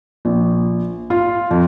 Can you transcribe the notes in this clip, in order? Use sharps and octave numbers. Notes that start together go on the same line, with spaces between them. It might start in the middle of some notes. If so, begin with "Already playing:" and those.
A#1
F4
F2